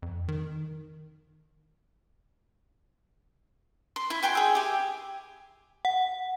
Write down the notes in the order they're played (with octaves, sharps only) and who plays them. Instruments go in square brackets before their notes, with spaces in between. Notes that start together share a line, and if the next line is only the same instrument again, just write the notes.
[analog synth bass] F2
D#3
[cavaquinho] C6
E4 C6
F#4 G5 G#5 C6
G#4 E5
G4 G#5
[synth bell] F#5